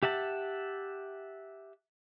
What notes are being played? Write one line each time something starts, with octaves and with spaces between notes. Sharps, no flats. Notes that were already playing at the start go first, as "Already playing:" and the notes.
G4 E5 F#5 A5